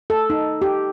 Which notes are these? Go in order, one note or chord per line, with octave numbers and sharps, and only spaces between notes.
A4
D#4
G4